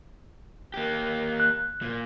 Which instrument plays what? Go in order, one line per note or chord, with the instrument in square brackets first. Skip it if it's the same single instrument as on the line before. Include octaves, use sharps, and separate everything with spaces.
[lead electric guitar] A#3 G4
[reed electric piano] F#6
[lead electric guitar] A#2